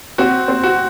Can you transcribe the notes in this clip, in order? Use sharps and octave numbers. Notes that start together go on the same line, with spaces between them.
C4 F#4
C4
F#4